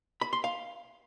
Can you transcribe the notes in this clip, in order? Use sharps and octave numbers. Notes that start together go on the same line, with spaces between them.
B5
C6
F5